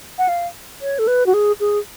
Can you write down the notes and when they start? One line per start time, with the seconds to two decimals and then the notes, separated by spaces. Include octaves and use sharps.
0.18 F#5
0.28 F5
0.81 C#5
0.99 A4
1.07 B4
1.26 F#4
1.34 G#4
1.60 G#4